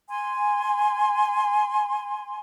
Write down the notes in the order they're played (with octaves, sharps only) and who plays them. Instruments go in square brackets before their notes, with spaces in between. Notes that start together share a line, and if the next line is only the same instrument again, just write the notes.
[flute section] G#5 C6